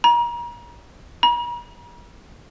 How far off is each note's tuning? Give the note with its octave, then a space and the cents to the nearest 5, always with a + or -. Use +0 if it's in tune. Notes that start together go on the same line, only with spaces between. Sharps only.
A#5 +35
A#5 +45